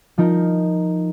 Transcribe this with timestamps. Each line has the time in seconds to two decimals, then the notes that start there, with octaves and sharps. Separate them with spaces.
0.18 F3 D#4 A#4